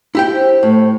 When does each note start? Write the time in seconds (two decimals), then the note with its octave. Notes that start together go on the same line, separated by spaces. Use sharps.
0.15 E4 G4 G5
0.33 C5
0.63 A2